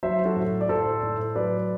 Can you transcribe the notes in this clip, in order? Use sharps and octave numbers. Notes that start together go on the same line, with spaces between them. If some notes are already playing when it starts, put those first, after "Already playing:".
F#3 C5 E5
F#4 A4
A2
D5
A2 A4 C5
A2
F#3 B4 D5